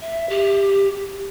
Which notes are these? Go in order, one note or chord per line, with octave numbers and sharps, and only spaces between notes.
E5
G4